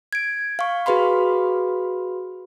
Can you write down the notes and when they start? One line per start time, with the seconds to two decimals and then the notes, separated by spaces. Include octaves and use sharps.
0.13 G#6 D7
0.59 F5 C#6
0.86 F#4 G#4 B4 F5 B5 C6